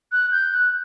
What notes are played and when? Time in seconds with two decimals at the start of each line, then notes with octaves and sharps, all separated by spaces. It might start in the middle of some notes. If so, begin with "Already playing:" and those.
0.12 F#6
0.31 G6
0.52 F#6